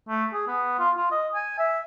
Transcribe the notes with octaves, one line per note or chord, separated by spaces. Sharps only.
A3
G#4
B3
F4
F4
D#5
G#5
E5